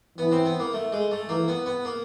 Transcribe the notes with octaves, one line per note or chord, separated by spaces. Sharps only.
E3 B3
C4
B3
A#3
A3
G#3
A3
E3 A#3
B3
B3
A#3